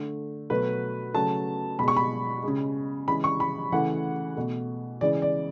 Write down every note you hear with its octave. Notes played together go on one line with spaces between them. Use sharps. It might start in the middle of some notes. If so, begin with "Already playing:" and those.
Already playing: D3 A3
B2 F#3 A3 B4
C#3 F#3 A3 A5
B2 G#3 B5
C#6
B5
C#3 G#3
C#3 E3 G#3 B5
C#6
B5
C#3 E3 A3 F#5
B2 A3
C#3 E3 G#3 D5
D5